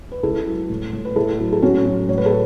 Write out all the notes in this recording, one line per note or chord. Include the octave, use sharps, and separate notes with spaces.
B4
C#2 E4 A4
F#3
A2
A2
B4
A2 E4 A4
F#3
A4
A2 C#4 F#4
F#3
A2 C#5
B4
A4